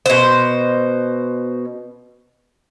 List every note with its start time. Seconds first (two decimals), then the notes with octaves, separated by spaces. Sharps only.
0.06 B2 C5